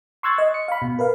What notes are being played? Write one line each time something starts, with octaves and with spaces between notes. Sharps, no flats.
C6 C#6 E6 F#6 G#6 A6
D#5
C#7
F5 B5
B2
A#4 B4 F5